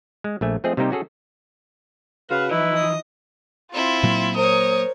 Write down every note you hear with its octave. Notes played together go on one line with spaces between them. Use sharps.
G#3
A#1 A3 G#5
F3 A3 C4 G#4 D#5
C3 G3 A#3 D#4 G4 C5
C#4 F#4 G#4 A4
C#3 F#4 B4 F5
E3 F3 D#4 E4 B4
D#5 D#6
C4 E4 F4
A#2 F#3 A#3
A#4 C5 C#5 D#6